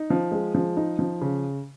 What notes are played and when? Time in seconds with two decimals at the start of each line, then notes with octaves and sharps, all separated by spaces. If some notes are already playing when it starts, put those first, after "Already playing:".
Already playing: D#4
0.10 F3
0.32 G#3
0.55 F3
0.77 D#4
0.99 F3
1.21 C#3